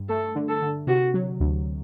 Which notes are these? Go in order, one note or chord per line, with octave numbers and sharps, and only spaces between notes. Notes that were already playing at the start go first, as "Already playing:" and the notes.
Already playing: G2
A3 A4
D3
A4
D3
C3 F#4
F#3
D2